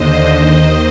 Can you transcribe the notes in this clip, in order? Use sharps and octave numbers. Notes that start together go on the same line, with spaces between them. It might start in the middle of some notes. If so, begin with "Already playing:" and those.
Already playing: D#2 D3 C5 D#5
D#2 D#3